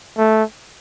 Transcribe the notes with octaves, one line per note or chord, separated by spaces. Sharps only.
A3